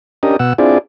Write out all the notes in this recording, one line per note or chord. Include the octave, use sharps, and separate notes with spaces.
C#4 D4 G4 A#4 D#5
B2 F#5 E6
C4 D4 E4 F4 G#4 D5